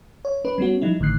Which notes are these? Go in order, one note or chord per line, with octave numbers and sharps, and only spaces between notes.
C#5
C#4 B4
G3 B3 C#4 F#4
F3 G3 D#4 E4
G#1 A2 D3 D#3 F#6 C7